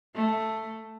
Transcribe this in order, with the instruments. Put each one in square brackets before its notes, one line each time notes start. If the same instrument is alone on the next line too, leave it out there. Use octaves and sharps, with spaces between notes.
[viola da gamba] A3